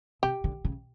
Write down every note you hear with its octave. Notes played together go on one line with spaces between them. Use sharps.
C3 G4
D3
C#3